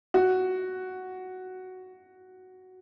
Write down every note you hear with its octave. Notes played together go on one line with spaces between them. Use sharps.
F#4